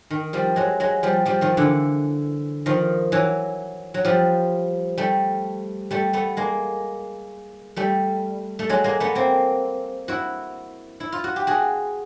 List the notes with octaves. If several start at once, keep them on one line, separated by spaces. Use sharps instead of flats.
D#3
F3 G3
F#3 G#3
F#3 G#3
F3 G3
F3 G3
D#3 F3
D3 E3
D#3 F3
E3 F#3
F#3
F3 G3
G3 A3
G3 A3
A3 B3
G#3 A#3
G3 A3
A3
F#3 G#3
G#3 A#3
A3 B3
A#3 C4
E4 F#4
E4
F4
F#4
G4
F#4 G#4